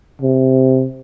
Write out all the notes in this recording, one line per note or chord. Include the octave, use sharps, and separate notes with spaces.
C3